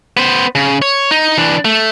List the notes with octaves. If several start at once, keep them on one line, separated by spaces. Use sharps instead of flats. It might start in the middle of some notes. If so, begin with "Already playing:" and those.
B3 C5
C#3
C#5
D#4
E3 D4
A3